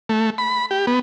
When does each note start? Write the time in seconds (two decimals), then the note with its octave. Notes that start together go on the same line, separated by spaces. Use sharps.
0.09 A3
0.38 B5
0.71 G4
0.87 B3